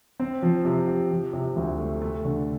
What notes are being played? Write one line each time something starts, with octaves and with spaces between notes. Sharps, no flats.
C4
F3
C3
G4
F3
C3
D2
A3
A3
D3